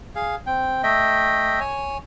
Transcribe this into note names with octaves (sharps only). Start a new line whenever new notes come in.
G#4 F5
C4 G5
A3 D#5 E5 G5
C#5 G#5